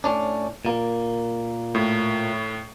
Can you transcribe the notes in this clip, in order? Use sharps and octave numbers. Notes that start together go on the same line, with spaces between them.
A2 C#4 D4
A#2 A#3
A2